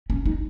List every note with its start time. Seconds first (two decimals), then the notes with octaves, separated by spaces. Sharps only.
0.10 C#4
0.26 D#4